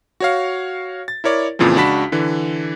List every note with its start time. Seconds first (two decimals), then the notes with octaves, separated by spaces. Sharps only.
0.20 F#4 C#5 F5
1.08 A6
1.24 E4 A#4 C#5 D5
1.59 F2 A#2 C#3 E3 F3
1.76 C#2 D4 F#4 A5 B5 B6
2.12 D3 E3